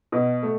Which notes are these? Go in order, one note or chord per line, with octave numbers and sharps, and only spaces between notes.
B2
A3